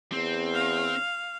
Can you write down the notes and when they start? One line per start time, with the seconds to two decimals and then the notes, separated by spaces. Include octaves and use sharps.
0.12 E2 C4
0.54 F5